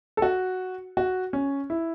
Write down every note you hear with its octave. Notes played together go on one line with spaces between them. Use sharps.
A4
F#4
F#4
C#4
E4